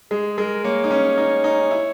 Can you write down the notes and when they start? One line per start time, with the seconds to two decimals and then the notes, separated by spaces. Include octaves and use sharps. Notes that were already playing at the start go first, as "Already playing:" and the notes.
0.11 G#3 G#4
0.38 G#3 A#4
0.64 A#3 C#5
0.84 D#4
0.91 C#4
1.18 D#4
1.44 D#4
1.71 E4